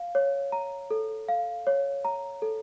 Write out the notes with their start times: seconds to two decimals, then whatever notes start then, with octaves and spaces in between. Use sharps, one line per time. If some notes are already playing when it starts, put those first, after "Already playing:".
Already playing: F5
0.15 C#5
0.52 A#5
0.91 A4
1.29 F5
1.67 C#5
2.05 A#5
2.42 A4